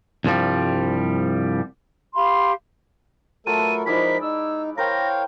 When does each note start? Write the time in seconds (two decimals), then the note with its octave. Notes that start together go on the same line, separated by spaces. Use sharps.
0.25 C2 G2 F3 G3
2.14 G4 F5 B5 C6
3.47 F#3 A3 F4 A4 A#4 A5 D#7
3.59 B4
3.86 F3 G#3 D#4 E4 A#4 D5 B6
4.21 D#4 E6
4.78 A#4 C5 C#5 F5 G5 A#6